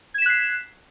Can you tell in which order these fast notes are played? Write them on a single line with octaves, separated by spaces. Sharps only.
G#6 E7 B6 F#6 C7